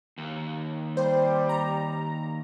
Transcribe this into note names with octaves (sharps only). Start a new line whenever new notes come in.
D#2
G3 C5
A#5